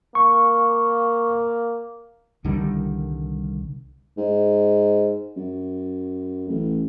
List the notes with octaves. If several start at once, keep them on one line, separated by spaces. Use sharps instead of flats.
A#3 C#6
C2 D3 D#3 G3
G#2
F#2
A1